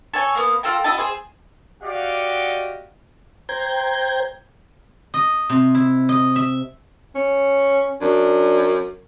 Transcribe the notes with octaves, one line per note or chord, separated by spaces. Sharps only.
A4 C#5 G#5
A#3 B3
F4 A4 G5 A#5
E4 F#4 D#5 A5
G#4 C5
F#4 G4 D5 D#5 F5 F#5
C5 G5 A#5 G6 G#6
D#5
C3
E4
D#5
E5
C#4
F#2 D4